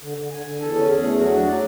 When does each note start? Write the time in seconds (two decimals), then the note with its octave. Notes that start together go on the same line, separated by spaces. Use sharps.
0.03 D3
0.18 D3
0.32 D3 G#5
0.46 D3
0.60 E2 A4
0.75 C#4
0.89 E2 G#4
1.03 A3
1.18 F#3 F#4
1.33 D4
1.47 F#3 D5